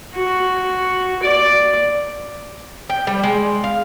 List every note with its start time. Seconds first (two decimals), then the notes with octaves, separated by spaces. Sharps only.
0.15 F#4
1.23 D5
2.90 G5
3.07 G3
3.23 G#3
3.64 F5